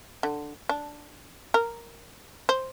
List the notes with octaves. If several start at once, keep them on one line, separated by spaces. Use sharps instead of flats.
D3
D4
A#4
C5